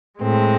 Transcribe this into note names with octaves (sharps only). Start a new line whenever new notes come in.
A2 G#3 C4